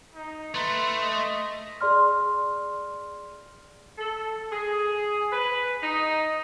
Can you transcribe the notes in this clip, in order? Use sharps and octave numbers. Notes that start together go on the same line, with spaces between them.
D#4
A3 B4 C6
D#5
G#4 D5 C6 F6
A4
G#4
B4
D#4